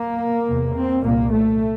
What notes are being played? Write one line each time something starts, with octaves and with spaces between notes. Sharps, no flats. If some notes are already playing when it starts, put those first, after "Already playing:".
Already playing: A#3
E2 C3
C4
C2 A#2 A#3
A3